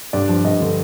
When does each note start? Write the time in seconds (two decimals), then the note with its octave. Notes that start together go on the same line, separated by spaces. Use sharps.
0.13 G2 D5
0.29 F3
0.45 G2 D#5
0.61 D3